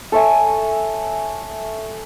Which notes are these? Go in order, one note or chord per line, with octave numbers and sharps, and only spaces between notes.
A4 C#5 E5 G#5